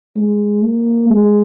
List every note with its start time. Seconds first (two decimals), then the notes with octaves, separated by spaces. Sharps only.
0.16 G#3
0.63 A#3
1.10 G#3